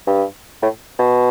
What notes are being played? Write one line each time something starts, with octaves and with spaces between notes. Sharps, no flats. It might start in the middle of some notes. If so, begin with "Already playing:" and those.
G2
A2
B2